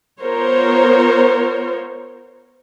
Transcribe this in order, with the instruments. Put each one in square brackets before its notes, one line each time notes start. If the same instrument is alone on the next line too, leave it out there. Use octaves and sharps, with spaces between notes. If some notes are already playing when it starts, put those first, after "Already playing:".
[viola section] B3 F4 A#4 C5 C#5